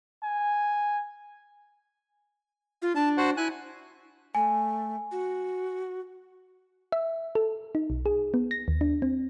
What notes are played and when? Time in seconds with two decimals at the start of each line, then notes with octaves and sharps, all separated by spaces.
0.23 G#5
2.82 F4
2.96 D4 A5
3.17 F#4 C5 F#5
3.37 E4 G#5 F#6
4.35 A3 G#5
5.12 F#4
6.92 E5
7.35 A4
7.75 D#4
7.90 B1
8.06 G#4
8.34 B3
8.51 A#6
8.68 D#2
8.81 D4
9.02 C4